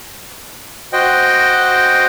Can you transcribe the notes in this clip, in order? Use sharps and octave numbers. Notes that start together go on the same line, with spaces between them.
F#4 C5 D#5 G5